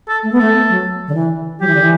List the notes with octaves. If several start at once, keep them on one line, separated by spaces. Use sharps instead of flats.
A4
A3
B3
A3 A4
F#3
D3
E3
F#3 G4
E3
D3
E3